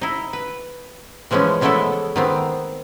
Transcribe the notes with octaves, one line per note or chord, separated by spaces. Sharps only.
D#4 E4
B4
E3 F3 G#3 B3 C#4
C#3 G#3 A3 B3 E4 A4
D#3 B3 C4